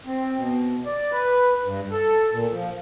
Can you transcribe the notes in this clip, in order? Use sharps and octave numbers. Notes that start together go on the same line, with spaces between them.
C4
B2
D5
B4
G2
A4
A#2
F3